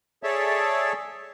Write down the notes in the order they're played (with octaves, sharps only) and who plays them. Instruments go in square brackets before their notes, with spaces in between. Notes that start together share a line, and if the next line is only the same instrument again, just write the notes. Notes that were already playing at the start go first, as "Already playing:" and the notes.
[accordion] G#4 A4 C#5 D5 E5 A5